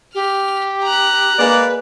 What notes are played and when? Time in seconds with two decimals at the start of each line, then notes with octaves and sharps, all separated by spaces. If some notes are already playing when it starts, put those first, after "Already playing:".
0.14 G4 F6
0.84 A#5 F#6
1.38 G#3 A#3 B4 D5